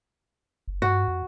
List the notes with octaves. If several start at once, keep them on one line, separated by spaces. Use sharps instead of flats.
F#1
G2 F#4
F2